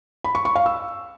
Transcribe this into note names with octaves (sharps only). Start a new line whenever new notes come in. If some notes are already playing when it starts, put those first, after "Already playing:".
B5
C#6
C#6
F5
E6